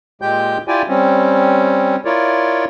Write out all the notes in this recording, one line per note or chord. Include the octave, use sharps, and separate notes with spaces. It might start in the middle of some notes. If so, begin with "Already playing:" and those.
A#2 G#3 G4 G5 G6
E4 F4 G4 D5 G5 G#5
G3 C4 C#4
E4 F4 A#4 C#5 D5